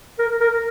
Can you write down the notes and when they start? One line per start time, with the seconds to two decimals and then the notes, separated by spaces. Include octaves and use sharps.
0.19 A#4
0.40 A#4